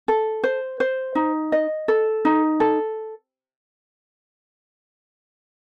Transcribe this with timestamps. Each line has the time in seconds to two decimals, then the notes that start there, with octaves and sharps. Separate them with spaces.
0.08 A4
0.44 C5
0.80 C5
1.15 D#4
1.52 D#5
1.88 A4
2.25 D#4
2.60 A4